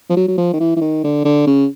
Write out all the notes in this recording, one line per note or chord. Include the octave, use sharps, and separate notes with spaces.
F3
F#3
F#3
F3
D#3
E3
E3
D#3
D3
D3
C#3